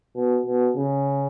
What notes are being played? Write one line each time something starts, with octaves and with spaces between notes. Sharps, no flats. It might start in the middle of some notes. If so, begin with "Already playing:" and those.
B2
B2
C#3